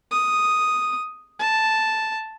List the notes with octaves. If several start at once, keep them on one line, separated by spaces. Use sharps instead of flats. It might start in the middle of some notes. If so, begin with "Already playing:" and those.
D#6
A5